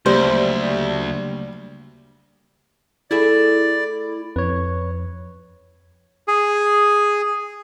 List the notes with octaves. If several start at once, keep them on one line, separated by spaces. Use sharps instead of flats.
D2 C#3 F#3 G3 A#3 C5
A3 E4 G#4 D5 E5
F2 B4 C#5
G#4